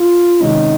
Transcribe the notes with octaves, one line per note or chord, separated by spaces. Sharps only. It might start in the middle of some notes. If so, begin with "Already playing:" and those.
Already playing: F4
C3 D#3 G#3 C#4 D#4